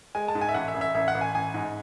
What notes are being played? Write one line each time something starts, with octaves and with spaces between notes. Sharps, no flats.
G#3 G#5
A5
G#2
G#5
E5
A1 F#5
E5
A1
E5
A1 E5
F#5
A1
G#5
A1 G#5
G#2